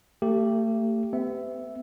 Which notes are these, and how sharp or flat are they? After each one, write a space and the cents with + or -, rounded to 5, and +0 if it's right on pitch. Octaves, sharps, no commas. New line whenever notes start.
A3 +35 G4 +0
B3 +40 E5 +0